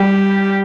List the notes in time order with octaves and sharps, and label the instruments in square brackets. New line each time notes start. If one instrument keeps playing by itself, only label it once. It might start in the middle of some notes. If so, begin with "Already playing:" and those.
Already playing: [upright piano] G3 [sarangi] G4